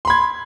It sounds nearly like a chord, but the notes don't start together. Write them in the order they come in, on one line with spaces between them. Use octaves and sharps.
C6 B5 G#6